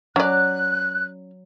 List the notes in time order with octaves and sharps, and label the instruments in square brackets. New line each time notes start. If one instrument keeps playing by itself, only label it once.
[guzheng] F#3 [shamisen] C#4 D5 [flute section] F#6